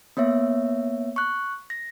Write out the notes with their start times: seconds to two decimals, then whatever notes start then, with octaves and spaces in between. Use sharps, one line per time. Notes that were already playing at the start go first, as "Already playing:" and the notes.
0.17 A#3 B3 C#5 E5
1.16 C#6 F#6
1.70 A#6